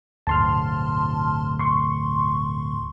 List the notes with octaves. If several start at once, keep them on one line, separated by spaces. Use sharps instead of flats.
D1 G2 B2 A5 C6 F6
C6 C#6